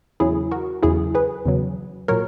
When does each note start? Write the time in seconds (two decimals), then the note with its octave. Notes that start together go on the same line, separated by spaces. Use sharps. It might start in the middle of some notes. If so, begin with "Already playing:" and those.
0.20 E2 C#3 F#3 E4 G#4
0.51 F#4 A#4
0.83 E2 C#3 F#3 E4 G#4
1.15 G#4 B4
1.46 E2 C#3 F#3
2.08 A#2 F#3 A#4 C#5